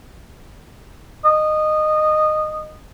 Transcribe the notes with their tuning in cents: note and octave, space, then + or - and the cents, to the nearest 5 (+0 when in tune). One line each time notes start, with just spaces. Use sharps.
D#5 -15